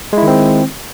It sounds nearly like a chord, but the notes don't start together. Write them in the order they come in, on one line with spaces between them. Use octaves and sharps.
G#3 E4 D#3 C4